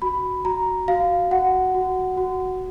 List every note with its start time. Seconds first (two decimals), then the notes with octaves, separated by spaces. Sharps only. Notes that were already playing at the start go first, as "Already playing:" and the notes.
0.02 F#4 B5
0.45 F#4 A#5
0.88 F#4 F5
1.31 F#4 F#5
1.74 F#4
2.17 F#4